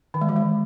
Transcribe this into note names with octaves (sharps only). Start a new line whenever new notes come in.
D#3
G#3
E3
G#3